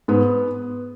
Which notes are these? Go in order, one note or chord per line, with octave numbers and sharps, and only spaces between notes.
G#2 B3